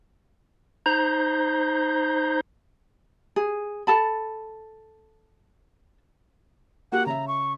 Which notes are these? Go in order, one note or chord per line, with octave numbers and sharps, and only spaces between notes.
D#4 C5 A#5 G6
G#4
A4 A5 B5
A#3 F#4 G4 F#5
C#3 E5 A#5
C#6